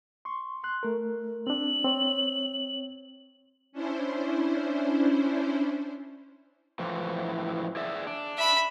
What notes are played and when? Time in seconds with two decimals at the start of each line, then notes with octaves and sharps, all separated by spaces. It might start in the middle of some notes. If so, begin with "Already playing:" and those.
0.25 C6 C#6
0.64 C6 F#6
0.83 A3 A#4
1.47 C4 D4 F#7
1.84 C4 C#5
3.72 C#4 D4 E4 C5
6.79 A2 E3 F3
7.77 G#4 D5 E5
8.07 D4
8.37 E5 B5